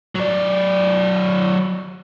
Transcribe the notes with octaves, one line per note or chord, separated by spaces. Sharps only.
F#3 D5